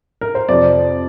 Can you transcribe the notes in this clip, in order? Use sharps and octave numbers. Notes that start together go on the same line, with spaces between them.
A#4
C5
F2 C3 F3 C4 D5